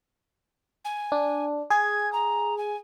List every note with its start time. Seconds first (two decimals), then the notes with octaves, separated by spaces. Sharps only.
0.85 G#5
1.12 D4
1.70 G#4 G#6
2.12 A#5
2.58 G#5